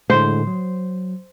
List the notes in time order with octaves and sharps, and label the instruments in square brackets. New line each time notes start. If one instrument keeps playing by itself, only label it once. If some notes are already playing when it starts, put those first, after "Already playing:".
[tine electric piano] A2 D3 G#3 [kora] C5
[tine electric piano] F#3